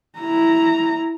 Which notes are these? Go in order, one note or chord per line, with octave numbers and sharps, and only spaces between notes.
E4 A#5